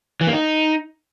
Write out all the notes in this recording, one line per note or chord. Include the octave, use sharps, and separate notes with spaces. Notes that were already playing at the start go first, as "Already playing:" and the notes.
E3
A#3
D#4